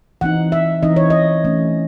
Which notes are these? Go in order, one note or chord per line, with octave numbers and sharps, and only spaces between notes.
E3 C4 D#4 F#5
E5
E3 C4 D#4 D#5
C#5
D#5
E3 A3 C#4